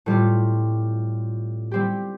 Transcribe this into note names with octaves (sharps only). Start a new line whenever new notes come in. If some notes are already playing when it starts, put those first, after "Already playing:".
A2 G3 C4 F4
G3 C4 G4